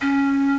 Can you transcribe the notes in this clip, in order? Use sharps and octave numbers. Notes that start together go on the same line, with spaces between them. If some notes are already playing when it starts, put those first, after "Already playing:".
C#4